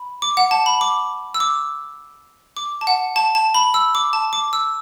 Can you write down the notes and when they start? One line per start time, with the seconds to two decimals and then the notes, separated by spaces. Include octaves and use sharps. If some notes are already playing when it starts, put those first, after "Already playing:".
Already playing: B5
0.22 D6
0.37 F#5
0.51 A5
0.66 B5
0.81 D6
1.34 E6
1.40 D6
2.57 D6
2.81 A5
2.87 F#5
3.16 A5
3.35 A5
3.54 B5
3.74 E6
3.95 D6
4.13 A5
4.33 D6
4.53 E6